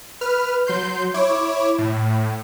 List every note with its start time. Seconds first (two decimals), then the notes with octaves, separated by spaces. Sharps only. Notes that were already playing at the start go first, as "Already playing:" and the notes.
0.21 B4 F6
0.67 F#3 C6 G6
1.14 E4 C#5 D6
1.78 A2